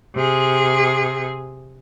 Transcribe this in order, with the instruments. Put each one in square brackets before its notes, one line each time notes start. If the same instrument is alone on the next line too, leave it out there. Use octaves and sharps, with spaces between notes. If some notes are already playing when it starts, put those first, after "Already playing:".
[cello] C3 G#4